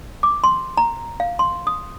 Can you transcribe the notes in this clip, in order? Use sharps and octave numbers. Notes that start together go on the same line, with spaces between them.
D6
C6
A#5
F5
C6
D#6